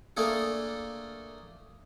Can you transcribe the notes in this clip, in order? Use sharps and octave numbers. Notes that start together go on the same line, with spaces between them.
A3 A#3 D4 G#4 A4